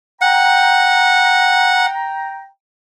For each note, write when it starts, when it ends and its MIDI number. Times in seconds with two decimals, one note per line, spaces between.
0.21 1.86 78
0.21 2.45 79
0.21 2.45 82